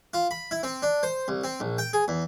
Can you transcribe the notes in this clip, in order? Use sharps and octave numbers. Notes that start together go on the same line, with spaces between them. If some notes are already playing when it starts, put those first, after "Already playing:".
F4
B5
E4
C4
D4
C5
C2
C4
A#1
G5
G#4
E2